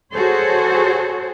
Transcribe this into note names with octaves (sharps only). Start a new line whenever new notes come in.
F#4 G#4 A4 C5 C#5